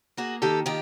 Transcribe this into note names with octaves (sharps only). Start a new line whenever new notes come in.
A#3 F#4 G#4
D#3 G4 A4
D#3 F4 G4